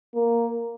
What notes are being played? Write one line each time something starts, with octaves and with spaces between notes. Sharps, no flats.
A#3